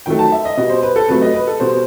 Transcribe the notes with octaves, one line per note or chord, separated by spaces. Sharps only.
D#3 F#3 A3 G5
A5
E5
D#5
B2 G3 D#5
C5
B4
A4
C3 F#3 A3 B4
D#5
B4
A4
B2 G3 C5